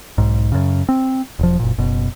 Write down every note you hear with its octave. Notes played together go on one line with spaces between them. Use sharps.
B1 G#2
F#2 C#3
C4
E1 F3
F#1 A#2
F#1 B2